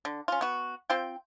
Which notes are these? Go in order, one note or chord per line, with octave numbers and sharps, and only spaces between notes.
D3
C#4 F4
B3 F#4
C4 F4 G5